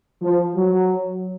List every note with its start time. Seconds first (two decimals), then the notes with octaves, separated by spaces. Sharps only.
0.22 F3
0.55 F#3